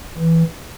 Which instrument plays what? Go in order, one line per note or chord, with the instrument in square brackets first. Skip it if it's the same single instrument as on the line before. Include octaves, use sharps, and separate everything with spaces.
[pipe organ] E3